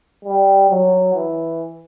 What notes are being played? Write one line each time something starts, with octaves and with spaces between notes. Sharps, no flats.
G3
F#3
E3